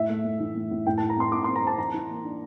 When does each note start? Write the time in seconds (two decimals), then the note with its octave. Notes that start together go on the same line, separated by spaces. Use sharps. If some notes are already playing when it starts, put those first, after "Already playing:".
Already playing: A2 E5
0.09 A3
0.24 A3
0.40 E3
0.55 A2
0.71 A2
0.86 A2 G5
0.98 A5
1.02 E4
1.09 A#5
1.17 C4 C6
1.32 A2 D6
1.44 C6
1.48 C4
1.56 A#5
1.63 C4 A5
1.78 E3 A#5
1.94 E3
2.09 A#3
2.24 D4